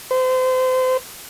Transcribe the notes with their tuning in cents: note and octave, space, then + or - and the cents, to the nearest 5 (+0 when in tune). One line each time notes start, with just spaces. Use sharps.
C5 -30